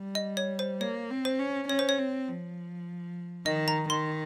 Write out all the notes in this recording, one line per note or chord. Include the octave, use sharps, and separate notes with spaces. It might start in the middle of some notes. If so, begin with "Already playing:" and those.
Already playing: G3
D#5
C#5
C5
A#3 C#5
C4
C5
C#4
C#4 C#5
C5
C#5
C4
F3
D#3 D#5
A#5
D#3 C6